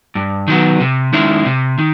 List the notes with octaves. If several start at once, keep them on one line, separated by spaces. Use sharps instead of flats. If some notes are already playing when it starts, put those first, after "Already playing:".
G2
D#3 F#3 B3
C3
D#3 G#3 C#4 E4
C3
D#3